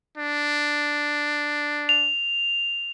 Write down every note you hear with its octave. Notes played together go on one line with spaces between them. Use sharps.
D4
F7